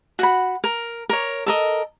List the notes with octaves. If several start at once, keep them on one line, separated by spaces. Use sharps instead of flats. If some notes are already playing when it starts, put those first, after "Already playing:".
F#4 F#5 B5
A#4
A#4 C#5
A4 A#4 D#5